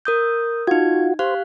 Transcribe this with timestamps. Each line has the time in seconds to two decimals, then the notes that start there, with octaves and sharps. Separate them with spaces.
0.05 A#4 D#6 G6
0.67 D#4 F4 F#4 G#6
1.19 G4 C5 F5 F#6